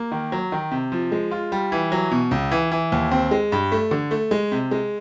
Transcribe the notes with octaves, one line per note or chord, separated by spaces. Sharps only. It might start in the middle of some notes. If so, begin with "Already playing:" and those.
Already playing: A#3
D#3
F#3
D#3
C3
F3
G#3
F4
G3
E3
F#3
B2
C#2
E3
E3
D#2
C4
G#3
G2
A3
D3
A3
G#3
C3
G#3